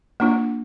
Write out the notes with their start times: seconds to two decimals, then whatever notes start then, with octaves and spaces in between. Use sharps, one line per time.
0.20 A#3 D4 F4